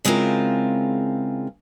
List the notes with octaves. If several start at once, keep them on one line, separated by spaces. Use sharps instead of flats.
C#3 G#3 C4 E4 F4 A#4